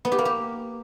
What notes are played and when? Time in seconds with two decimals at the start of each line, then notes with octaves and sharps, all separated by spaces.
0.05 B3
0.12 G4
0.18 A#3
0.25 G4